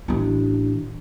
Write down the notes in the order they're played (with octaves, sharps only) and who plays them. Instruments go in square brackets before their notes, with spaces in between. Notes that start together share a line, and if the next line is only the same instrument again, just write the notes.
[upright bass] A1 D4